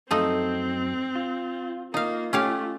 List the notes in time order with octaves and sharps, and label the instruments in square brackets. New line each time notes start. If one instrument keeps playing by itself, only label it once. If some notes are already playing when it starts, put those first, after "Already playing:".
[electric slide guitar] F#2 F#3 A4 [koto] F3 A3 D#4 [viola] C4
[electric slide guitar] F4
[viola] A#3 [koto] D#4 F5 [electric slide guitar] F4
[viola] A3 [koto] C#4 G4 F5